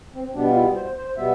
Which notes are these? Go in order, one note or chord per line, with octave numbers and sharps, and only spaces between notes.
C4
B2 G3 B3 D4
F4
E4
C5
C5
B2 G3 B3 E5